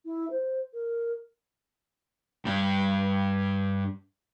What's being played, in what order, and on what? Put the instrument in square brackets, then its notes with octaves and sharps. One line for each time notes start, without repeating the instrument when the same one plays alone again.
[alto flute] E4
C5
A#4
[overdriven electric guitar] G2 D4